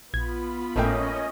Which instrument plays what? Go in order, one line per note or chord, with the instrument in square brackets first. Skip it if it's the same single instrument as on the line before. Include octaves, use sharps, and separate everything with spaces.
[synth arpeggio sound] A#1 G#6 [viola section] B3 F4 B5
[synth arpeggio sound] G#1 A2 [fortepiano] A3 A#3 G5 [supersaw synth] C#4 D#5